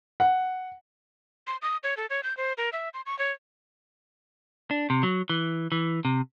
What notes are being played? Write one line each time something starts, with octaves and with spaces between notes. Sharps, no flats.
F#5
C6
D#6
C#5
A4
C#5
G6
C5
A#4
E5
C6
C#6
C#5
D4
C3
F#3
E3
E3
C3